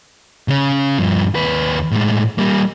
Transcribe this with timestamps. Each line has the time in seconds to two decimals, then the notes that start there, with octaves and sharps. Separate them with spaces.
0.48 C#3 C#4
0.98 G2 F3
1.35 D#2 B4
1.91 A2 G#3
2.38 G3 A#3